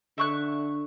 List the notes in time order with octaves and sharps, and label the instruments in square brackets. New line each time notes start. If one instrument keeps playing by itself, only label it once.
[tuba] D3 [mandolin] E5 C#6 F#6